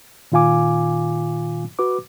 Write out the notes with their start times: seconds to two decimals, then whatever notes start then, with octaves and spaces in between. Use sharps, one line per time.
0.32 A#2 D#3 F4 F5 G#5 D6
1.79 F#4 B4 D6